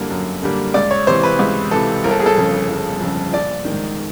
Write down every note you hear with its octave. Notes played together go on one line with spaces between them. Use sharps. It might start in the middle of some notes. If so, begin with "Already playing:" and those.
Already playing: F#2 D3 G3 A#3
F#2
D3 G3 A#3
C#2 D5
C#5
C3 E3 C5
B4
C#2
C3 E3 A4
G1 A#4
A4
G#4
A4
F2 C#3
G1
F2 C#3
A#1 D5
D#3
G#2